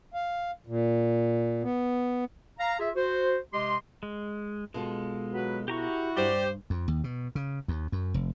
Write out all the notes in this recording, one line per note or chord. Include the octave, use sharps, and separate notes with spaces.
F5
A#2
B3
F5 A#5
F4 G#4 E5
F#4 C5
C3 G#3 G4 D#5 C6
G#3
B2 G#3 F4 A4
F#3 F#4 B4
E4 F#4 G4 A#5 C#6
G2 G4 C5 D5
F2
D#2
B2
C#3
D#2
F#2
F1